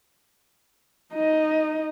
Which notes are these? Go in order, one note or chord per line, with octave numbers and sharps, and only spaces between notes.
D#4 D#5